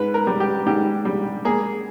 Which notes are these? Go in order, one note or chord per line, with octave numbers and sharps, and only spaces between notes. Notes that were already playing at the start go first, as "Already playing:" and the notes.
Already playing: G#2 B4
A#4
G3
G4
G#2 G4
G3
A#3 G#4